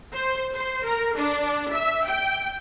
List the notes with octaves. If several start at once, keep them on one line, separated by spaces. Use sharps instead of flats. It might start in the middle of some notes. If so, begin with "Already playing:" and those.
C5
C5
A#4
D4
E5
G5